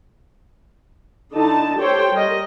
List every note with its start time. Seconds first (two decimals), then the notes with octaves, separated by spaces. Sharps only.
1.32 D3 D#4 E4 A5
1.77 G4 A4 C5 C#5 G5
2.12 G3 A#4 D#5